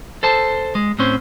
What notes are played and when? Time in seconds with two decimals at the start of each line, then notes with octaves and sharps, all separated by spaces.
0.23 A4 C5 A5
0.75 G#3
0.99 A2 C4 C#4 C5